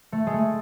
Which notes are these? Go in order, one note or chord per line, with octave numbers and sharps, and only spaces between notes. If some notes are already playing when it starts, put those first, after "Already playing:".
A3
G#3
A3